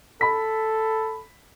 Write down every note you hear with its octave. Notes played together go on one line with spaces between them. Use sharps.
A4 B5 B6